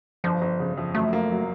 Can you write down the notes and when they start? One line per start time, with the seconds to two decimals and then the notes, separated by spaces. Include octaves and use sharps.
0.24 G1 F3
0.41 G1
0.60 C#3
0.78 F2
0.95 F#2 A3
1.13 A#3
1.31 F#3